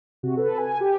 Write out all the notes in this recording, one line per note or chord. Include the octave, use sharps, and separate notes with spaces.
C3 F#4
A4 B4
G#5
G4